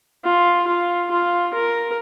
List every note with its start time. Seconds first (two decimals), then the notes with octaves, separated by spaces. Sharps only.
0.24 F4
0.67 F4
1.11 F4
1.54 A#4